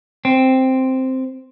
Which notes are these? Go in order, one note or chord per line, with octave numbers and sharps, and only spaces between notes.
C4